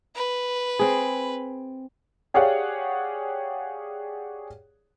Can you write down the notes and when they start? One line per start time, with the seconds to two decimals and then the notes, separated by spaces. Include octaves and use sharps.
0.15 B4
0.79 C4 G#4
2.34 G4 G#4 C#5 D5 F5 F#5